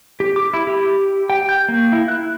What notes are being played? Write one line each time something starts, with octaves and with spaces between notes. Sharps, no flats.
G4
D6
E4
G4
G5
G6
A#3
E4
F#6